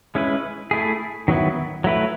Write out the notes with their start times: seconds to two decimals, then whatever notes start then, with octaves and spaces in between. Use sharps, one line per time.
0.15 G#3 C#4 E4 B4
0.71 A3 E4 G#4
1.28 D#3 F#3 B3 E4
1.84 F#3 A3 E4 B4